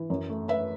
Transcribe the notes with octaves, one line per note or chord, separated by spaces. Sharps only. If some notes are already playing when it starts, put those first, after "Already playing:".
Already playing: E3
F#2
A3
A3 B4 E5